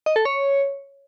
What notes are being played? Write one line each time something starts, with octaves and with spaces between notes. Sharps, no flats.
D#5
A4
C#5